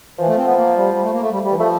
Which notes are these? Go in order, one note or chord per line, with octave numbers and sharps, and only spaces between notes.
E3 F3
A3
C4
B3
A#3
G3
G3
A3
A#3
A3
G3
G3
E3
F3 A3